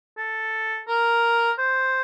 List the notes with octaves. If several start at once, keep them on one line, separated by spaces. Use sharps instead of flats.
A4
A#4
C5